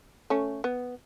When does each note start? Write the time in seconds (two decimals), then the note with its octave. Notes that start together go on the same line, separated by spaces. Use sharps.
0.30 A3 C#4
0.64 B3